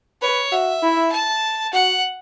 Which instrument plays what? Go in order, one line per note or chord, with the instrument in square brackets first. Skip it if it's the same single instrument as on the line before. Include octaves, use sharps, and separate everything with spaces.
[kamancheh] B4 [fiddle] C#5
[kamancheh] F#4 [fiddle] E5
[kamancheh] E4
[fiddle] A5
[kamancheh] F#4 [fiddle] F#5